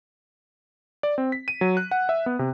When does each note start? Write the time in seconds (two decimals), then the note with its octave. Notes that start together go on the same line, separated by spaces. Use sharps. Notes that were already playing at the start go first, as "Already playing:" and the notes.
1.03 D5
1.18 C4
1.32 B6
1.48 D#7
1.61 F#3
1.77 F#6
1.91 F#5
2.09 E5
2.26 B3
2.39 C3